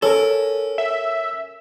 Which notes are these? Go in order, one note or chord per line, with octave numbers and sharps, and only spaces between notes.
C#4 A4 A#4
E5